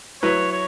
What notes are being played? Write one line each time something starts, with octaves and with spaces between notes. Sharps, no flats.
F#3 E4 B4 C#5
C#5